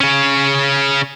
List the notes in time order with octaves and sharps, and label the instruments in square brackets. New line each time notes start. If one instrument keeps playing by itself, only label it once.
[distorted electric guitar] C#3 C#4